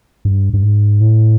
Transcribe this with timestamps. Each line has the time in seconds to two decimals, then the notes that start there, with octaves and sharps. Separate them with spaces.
0.25 G2
0.54 G2
0.63 G#2
1.00 A2